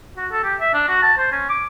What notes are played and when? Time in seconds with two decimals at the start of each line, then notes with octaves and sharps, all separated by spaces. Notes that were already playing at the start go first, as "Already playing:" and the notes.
0.17 F#4
0.32 A4
0.44 G4
0.60 E5
0.74 D4
0.89 F#4
1.03 A5
1.18 C5
1.32 C#4
1.49 D6